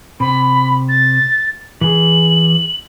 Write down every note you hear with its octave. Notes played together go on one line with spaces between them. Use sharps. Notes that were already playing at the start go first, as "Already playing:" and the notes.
C3 B5
A6
E3 G#4 F#7